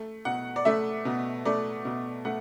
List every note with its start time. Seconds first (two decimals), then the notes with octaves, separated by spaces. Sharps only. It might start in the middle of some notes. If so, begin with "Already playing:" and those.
Already playing: A3
0.25 B2 F#5
0.56 D5
0.65 A3 E5
1.05 B2
1.45 A3 D5
1.85 B2
2.25 A3 F#5